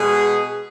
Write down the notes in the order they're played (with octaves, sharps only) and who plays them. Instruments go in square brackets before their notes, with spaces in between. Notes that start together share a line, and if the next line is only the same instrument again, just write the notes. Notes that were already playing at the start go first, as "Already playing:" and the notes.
Already playing: [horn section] B2 G#3 G#4